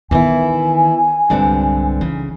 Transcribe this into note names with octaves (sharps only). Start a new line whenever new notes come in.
D#3 E3 B3 E4 G#5
C2 G2 D3 G#3 C4
C#3 E3